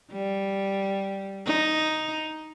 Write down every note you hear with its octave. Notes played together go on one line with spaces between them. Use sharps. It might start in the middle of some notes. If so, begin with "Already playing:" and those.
G3
D#4